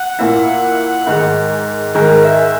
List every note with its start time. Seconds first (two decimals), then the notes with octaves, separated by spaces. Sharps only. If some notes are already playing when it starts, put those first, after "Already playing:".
Already playing: F#5
0.19 A#2 A#3 E4
1.07 G#2 D#3 G#3
1.95 G#2 D#3 G#3 A#4
2.24 E5